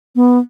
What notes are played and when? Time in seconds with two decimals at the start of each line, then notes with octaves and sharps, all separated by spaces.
0.16 B3